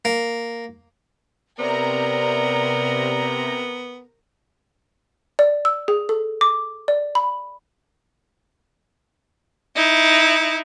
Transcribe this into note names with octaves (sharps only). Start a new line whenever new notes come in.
A#3
C3 B3 A#4 D5 A#5
D5
E6
G#4
A4
D6
D5
B5
D#4 E4